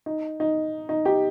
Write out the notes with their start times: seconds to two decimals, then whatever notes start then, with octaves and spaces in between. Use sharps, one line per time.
0.06 D#4
0.40 D#4
0.89 D#4
1.05 D#4 G4